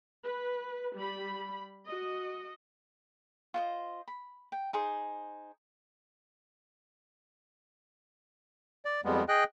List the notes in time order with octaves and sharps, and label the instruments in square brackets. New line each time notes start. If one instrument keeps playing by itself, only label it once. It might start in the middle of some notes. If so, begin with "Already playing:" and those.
[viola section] B4
G3 B5
F#4 D#5
[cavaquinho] F4 C5 D#5
B5
G5
D#4 G#4 C5
[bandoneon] D5
F2 G3 G#3 B3
G#4 D#5 G5 F#6